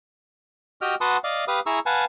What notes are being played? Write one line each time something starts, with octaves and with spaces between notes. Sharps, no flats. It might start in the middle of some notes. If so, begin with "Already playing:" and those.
F#4 G4 D#5 G5 F6
F#4 B4 F#5 A5 C6 D#6
D5 D#5 F5
G4 B4 F5 D#6
E4 G#4 A#5 C#6 E6
B4 F5 F#5 G#5 A5